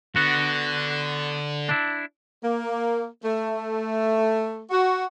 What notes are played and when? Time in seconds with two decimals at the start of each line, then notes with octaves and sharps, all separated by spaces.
0.16 D3 B3 F#4
1.69 D4 E4
2.44 A#3
3.24 A3
4.71 F#4